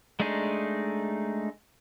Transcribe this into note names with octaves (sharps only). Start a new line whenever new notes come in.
G#3 A3 D4 D#4 G#4